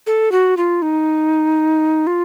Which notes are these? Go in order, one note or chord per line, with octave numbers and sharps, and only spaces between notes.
A4
F#4
F4
D#4
F4